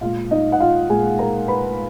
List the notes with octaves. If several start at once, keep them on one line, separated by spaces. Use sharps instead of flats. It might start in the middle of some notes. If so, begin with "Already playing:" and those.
A#2 G#3 F4 F5
D#4 D#5
F#5
F4 F5
A#2 G#3 G#4 G#5
A#4 A#5
B4 B5